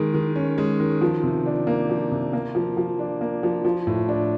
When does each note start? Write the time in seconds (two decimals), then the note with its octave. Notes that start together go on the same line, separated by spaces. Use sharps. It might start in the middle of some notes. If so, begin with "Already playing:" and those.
Already playing: D#3 G#3
0.14 D#3
0.36 C#4
0.58 G#3
0.80 D#3
1.01 F3
1.23 C3
1.46 D4
1.67 A#3
1.89 F3
2.11 C3
2.33 A#3
2.55 F3
2.77 F3
2.99 D4
3.21 A#3
3.43 F3
3.65 F3
3.87 A2
4.09 D4